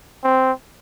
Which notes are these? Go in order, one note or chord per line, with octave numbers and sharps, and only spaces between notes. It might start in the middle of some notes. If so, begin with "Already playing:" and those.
C4